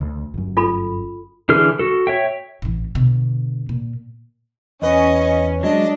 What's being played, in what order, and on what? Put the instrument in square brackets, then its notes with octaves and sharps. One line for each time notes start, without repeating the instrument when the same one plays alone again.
[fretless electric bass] D2
G1 F#2
[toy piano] F4 A4 B5
[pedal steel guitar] D3 E3 G#4 F6
F#4 A4
C#5 E5 G5
[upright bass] A1 E3
B2 D3
A#2
[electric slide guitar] E2 B4 [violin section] C#4 [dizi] D#5
[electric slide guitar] F#3 G#3 [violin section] D4 [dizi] D#5